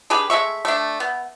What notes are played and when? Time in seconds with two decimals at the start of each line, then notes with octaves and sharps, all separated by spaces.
0.10 D4 G4 G#4 B4
0.30 G#3 A3 E5 C#6
0.65 A3 D4
1.00 B3